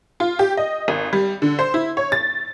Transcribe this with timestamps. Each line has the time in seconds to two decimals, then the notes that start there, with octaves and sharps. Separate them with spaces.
0.20 F4
0.39 G4
0.57 D#5
0.88 G#1
1.13 G3
1.42 D3
1.59 C5
1.74 E4
1.97 C#5
2.12 A6